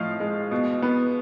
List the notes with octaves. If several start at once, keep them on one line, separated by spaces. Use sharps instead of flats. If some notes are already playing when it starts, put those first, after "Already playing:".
Already playing: A2 F3 D#5 F5
G#3
B2
B3